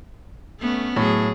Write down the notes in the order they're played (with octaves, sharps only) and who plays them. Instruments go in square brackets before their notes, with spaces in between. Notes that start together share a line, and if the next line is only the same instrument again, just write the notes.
[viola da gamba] A3 B3 C#4
[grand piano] A2 [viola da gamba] F#3 G#4